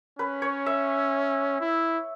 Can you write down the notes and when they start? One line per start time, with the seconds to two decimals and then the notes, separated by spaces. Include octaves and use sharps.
0.19 C#4 B4
0.42 C#5
0.66 E5
1.61 E4